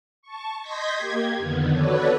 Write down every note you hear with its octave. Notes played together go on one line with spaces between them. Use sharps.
A5 C#6
D#5 C6 G6 G#6 A#6 B6
A#3 G4 G#6
F2 D3 D#3 B3
F#4 A4 B4 C#5 D5